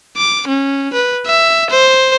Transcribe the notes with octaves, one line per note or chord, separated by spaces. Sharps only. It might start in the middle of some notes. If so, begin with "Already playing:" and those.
D6
C#4
B4
E5
C5